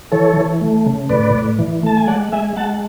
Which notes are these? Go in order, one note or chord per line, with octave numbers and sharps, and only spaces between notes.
E3 A4 C#5
E3
A3
C#3
A2 B4 D5
A2
E3
A3 A5
G#5
G#3 D5 F#5
G#3 E5 G#5
G#3 F#5 A5